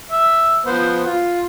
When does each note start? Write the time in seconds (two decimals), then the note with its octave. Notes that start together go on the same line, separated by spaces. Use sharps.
0.11 E5
0.66 F3 B3 C5
1.06 F4